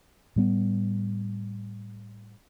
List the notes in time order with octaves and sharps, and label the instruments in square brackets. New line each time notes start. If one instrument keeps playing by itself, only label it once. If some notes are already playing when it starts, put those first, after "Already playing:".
[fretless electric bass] A2 G3 B3